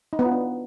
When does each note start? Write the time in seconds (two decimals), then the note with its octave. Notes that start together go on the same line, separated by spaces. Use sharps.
0.13 D#4
0.19 B3
0.25 F4
0.32 D4